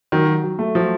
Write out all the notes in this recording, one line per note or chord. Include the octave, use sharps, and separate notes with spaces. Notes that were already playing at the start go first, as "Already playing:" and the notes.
D#3 F#3
F#3
F#3
A3
F3 F#3